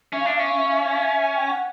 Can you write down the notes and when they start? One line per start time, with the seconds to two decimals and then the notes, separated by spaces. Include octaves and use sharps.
0.13 C#4 E5
0.20 F5
0.26 D4 E5
0.35 F5
0.39 C#4 E5
0.50 F5
0.58 E5
0.66 F5
0.73 E5
0.80 F5
0.88 E5
0.95 F5
1.02 E5
1.36 G5
1.51 F#5